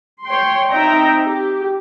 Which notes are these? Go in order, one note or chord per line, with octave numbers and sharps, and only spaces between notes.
C#5 G5 C6
C4 D#4 E5 G5 A#5
G4